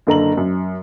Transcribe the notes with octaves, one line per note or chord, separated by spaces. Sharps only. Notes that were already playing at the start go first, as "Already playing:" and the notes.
F#1 D3 A#5 F#7
F#2